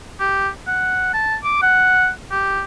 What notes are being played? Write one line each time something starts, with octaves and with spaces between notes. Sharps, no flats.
G4
F#5
A5
D6
F#5
G4